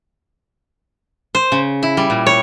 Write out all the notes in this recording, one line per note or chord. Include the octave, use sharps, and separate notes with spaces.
C5
C#3
E4
G3
A#2
C#5